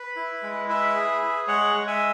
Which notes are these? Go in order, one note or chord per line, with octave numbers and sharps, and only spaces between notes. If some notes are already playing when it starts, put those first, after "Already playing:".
Already playing: B4
E4
G#3
E4 B4 E5
G#4
G#4
G#3 C#5 F#5
G#3
E5 G#5